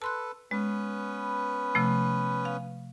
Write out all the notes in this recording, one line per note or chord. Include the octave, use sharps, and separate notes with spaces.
A4 B4 A5 C6 F#6
G#3 B3 C#4 B4
C3 F3 A3
F5